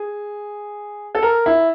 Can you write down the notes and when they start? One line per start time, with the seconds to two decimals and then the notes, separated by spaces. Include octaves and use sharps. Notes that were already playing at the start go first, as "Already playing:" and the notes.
Already playing: G#4
1.15 A4
1.23 A#4
1.46 E4